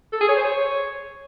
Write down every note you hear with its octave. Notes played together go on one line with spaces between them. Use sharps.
A4
G#4
C#5
C5
C#5